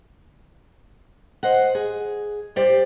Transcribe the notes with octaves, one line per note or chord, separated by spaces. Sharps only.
C5 D#5 F#5
G#4
G3 G4 C5 D5